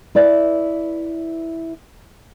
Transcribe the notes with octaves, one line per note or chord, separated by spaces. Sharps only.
E4 B4 D5 E5